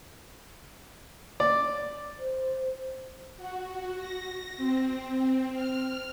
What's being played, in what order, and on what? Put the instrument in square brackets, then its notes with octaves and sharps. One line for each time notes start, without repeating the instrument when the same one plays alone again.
[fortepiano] D5
[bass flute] C5
[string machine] F#4
A#6
C4
F6